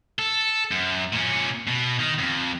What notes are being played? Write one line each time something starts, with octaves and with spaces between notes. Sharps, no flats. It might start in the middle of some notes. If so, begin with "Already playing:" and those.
A4
F#2
A#2 C#4
B2
D#3
F2